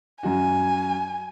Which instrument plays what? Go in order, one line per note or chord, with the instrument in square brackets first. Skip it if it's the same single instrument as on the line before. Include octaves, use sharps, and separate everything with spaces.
[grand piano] F#2 F#4 [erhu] G#5